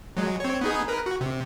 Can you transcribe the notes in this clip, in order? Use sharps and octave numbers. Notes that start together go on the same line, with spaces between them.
F#3 G#3
C4 C#5
B3 D#4 G#4
A#4 B4
F#4
C3